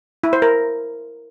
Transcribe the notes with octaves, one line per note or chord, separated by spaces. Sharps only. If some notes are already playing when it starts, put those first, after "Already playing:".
E4
C5
A#4